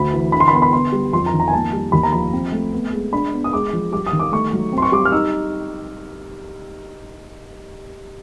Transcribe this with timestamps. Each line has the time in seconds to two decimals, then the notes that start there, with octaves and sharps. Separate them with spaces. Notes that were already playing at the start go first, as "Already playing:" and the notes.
Already playing: D2 B5
0.13 E3
0.32 D3 B5
0.40 C6
0.48 B5
0.53 B3 C6
0.62 B5
0.73 B3 C6
0.92 G3
1.13 F2 C6
1.26 A#5
1.33 D#3
1.40 A#5
1.48 G#5
1.53 A#3 A5
1.73 G3
1.92 D#2 B5
2.03 A#5
2.13 F3 B5
2.33 C4
2.52 A3
2.73 B3
2.93 G#3
3.13 D4 B5
3.33 B3
3.44 D#6
3.53 G#3 D6
3.73 F3
3.92 G3 D6
4.07 D#6
4.13 D#3
4.20 D6
4.32 A3 C#6
4.53 F#3
4.73 C4
4.78 C6
4.82 C#6
4.92 G3 D6
5.05 F6
5.12 D#4 E6